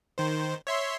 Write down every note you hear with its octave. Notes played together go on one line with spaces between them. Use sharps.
D#3 C5
C#5 E5 C6